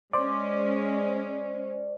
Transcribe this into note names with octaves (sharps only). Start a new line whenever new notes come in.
G#3 C#4 C5 D5